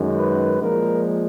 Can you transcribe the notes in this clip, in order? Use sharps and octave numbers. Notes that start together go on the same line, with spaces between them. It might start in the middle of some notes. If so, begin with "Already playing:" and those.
Already playing: F#2 D#3 G#3
B4
A#2 F3 G#3 A#4